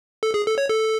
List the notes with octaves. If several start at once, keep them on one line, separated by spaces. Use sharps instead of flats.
A4
G#4
A4
C#5
A4